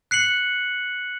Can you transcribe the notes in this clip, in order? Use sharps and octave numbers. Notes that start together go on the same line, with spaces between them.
F#6 C7 C#7 F#7